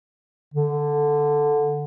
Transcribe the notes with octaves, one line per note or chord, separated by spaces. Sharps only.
D3